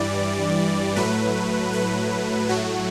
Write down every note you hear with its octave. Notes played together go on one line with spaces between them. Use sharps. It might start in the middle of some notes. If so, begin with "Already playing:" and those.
Already playing: G2 E3 G3 D5
A2 F#3 A3 B4
B4
A2 F#3 A3 F#4